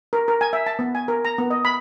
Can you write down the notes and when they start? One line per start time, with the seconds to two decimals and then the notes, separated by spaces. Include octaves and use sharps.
0.13 A#4
0.28 A#4
0.41 G#5
0.53 E5
0.66 A5
0.79 B3
0.95 G#5
1.08 A#4
1.25 A#5
1.38 B3
1.50 D#5
1.65 B5